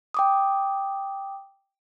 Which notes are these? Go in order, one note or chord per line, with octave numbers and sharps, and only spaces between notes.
G5 D6 D#6